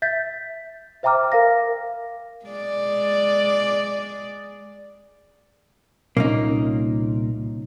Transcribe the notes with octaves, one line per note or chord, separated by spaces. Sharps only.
E5 G6 A6 B6
C5 E5 G5 A#5 D6 F6
A#4 F5 A#6
G#3 D5
C2 A#2 A#3 C#4 D#4